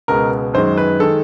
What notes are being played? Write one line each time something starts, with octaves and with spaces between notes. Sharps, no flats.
C#2 B2 G#3 A#4
F#2 D#3 G#3 C5
B4
D#3 G#3 A4